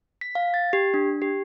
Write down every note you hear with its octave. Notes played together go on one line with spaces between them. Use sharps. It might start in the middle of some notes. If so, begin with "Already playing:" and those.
B6
F5
A6
G4
D4
G4